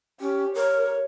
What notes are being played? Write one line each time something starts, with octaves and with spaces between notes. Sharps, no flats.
C#4 G4
A#4 C#5